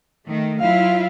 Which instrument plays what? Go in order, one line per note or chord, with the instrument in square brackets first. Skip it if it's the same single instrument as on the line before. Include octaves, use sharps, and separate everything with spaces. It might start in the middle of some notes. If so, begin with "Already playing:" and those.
[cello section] D#3 A3
[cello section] F#3 E4 F4 [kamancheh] F5